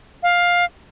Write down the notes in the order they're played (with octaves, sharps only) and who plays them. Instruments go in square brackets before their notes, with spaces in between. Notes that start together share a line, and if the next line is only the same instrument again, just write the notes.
[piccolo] F5